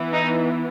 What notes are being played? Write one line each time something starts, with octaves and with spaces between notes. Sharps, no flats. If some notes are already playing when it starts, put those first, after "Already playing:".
Already playing: E3 B3
D#4